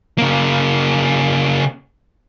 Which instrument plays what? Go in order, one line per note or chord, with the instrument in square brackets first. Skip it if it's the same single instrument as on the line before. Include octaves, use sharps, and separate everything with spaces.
[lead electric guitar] C#3 A#3